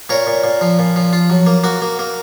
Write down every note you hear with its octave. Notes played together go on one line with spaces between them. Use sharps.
A#2 A#4 C#5
A#2
A#2
F3
A#2
F3
F4
F#3
A#3
A#3 F#4
A#3
A#3